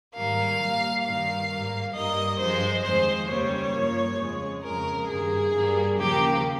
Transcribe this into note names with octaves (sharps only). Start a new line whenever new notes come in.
G#2 D#3 G3 A#3 F5
A#2 G3 A#3
G2 D#3 G3 A#3 F5
G#2 G3 A#3
G2 G3 A#3 D#5
G2 F3 G#3 C5
F2 D#3 G#3 C5
D#2 C#3 G3 A#3 C#5
G2 F3 A#3
F2 C#3 G#3
F2 C#3 G#3 A#4
G2 D#3 A#3 G#4
G2 G3 A#3
D#2 C#3 F3 A#3 G4